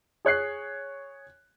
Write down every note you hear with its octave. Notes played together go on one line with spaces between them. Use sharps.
G#4 C#5 F#6 C7